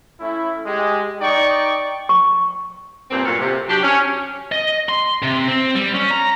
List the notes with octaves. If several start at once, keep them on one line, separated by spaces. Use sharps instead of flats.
A3 C#4 E4
G#3 G4
D#4 D5 G5 C#6
C#6
G2 A#2 A#3 C4
A#2 F#3 C#4 F4 F#4 A4
C3
F#3 D4 F#4 G4
C#4
D#5
C6
C3
C4
G3
C#4
A#5